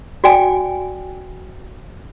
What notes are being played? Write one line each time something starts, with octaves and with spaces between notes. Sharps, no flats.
F#4 D5 G5 G#5